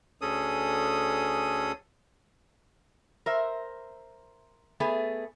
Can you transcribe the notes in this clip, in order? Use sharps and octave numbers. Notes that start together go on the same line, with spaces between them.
D2 C#4 G#4 A4 D#6
A#4 C5 E5
A3 B3 G#4